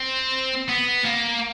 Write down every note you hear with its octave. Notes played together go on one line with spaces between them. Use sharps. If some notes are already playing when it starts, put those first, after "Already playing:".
Already playing: C4
B3
A#3